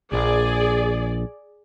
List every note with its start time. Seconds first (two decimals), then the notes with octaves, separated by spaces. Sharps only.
0.12 A#1 G#4 D5